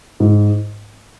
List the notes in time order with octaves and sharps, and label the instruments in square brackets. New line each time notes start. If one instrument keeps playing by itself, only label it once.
[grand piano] G#2